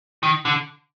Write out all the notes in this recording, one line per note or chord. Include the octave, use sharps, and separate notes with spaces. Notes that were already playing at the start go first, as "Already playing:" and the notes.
D#3
D3